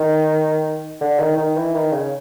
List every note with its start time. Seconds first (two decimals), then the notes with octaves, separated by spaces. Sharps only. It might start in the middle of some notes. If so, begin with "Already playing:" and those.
Already playing: D#3
1.01 D3
1.19 D#3
1.37 D#3
1.56 E3
1.74 D#3
1.92 C#3